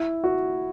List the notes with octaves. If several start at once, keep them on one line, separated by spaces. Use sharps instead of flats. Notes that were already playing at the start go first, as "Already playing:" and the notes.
Already playing: E4
F#4